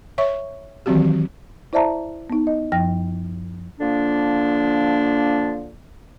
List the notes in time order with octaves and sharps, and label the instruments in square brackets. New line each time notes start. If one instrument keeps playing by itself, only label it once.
[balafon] C#5 E5 C#6
D#3 E3 F#3 C4 F#4 G4
[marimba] E4 C5 D5 E5 A5 A#5
B3 D#4
D#5
F#2 F3 G5 A#6
[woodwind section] D3 F3 A#3 D4